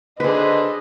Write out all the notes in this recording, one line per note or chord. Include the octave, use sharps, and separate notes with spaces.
D3 G#4 B4 C5 D#5